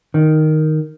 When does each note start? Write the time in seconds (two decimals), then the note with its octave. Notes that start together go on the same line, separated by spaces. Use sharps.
0.14 D#3